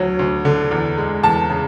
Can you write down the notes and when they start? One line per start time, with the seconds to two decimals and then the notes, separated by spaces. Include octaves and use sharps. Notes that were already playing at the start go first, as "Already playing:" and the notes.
Already playing: D2 F#3
0.19 D2
0.45 D3
0.71 E2
0.97 G#3
1.23 E2 A5
1.50 C#3